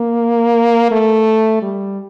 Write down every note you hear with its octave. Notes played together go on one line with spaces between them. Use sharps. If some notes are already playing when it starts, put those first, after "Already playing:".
Already playing: A#3
A3
G3